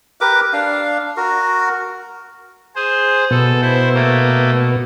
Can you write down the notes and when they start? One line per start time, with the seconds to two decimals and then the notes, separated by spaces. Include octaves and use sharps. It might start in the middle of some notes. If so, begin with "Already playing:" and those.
0.21 G4 A#4 B4 D6
0.53 D4 F5
1.17 F#4 A#4
2.76 G#4 C5
3.31 B2 A4
3.62 E4 C5
3.95 A3 A#3